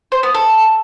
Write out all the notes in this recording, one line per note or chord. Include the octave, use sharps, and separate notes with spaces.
C5
B3
A4